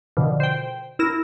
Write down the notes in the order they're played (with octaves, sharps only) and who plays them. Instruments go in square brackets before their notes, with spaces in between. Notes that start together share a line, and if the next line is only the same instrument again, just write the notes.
[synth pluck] B2 D3 D#3 F3
C5 G5
E4 A#4 A#6 E7